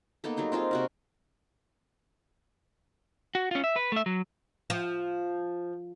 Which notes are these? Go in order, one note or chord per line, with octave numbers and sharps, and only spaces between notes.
A#3 B3 D#4 A4
F#3 G3 D#4 C6
C4 D#4 F4 G#4
C3 F#4 A#4
F#4
C#4 F4
E5
B4
A3 E5
F#3
F3